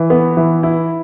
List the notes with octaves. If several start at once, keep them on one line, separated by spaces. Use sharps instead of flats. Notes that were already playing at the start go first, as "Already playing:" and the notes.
Already playing: E3
B3
E3
E4